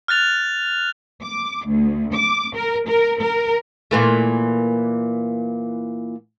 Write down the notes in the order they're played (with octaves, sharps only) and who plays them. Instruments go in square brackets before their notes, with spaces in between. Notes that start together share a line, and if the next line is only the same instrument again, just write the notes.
[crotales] F6 F#6 A6 F7
[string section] D6
D2
D6
A#4
A#4
A#4
[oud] A#2 E3 A3